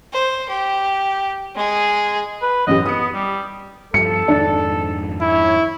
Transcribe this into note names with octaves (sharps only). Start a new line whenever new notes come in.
C5
G4
G#3 G#4
B4
A1 F#2 G4 D#5
B3 D#6 C#7
G3
G2 F3 A4 C#7
F2 G#2 D#3 D4
C#4 E4 C#5